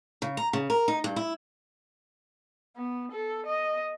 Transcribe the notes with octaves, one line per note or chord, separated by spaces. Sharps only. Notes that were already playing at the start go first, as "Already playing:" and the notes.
C#3
A#5
C#3
A#4
D#4
G2
E4
B3
A4
D#5